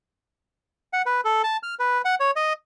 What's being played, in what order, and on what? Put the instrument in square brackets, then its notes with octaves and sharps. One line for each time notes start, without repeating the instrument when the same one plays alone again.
[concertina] F#5
B4
A4
A5
F6
B4
F#5
C#5
D#5